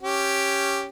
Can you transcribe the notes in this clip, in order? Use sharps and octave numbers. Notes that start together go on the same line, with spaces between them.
C#4 G4